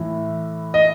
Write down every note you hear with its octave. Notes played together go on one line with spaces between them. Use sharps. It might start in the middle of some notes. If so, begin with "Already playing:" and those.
Already playing: A2 E3
D#5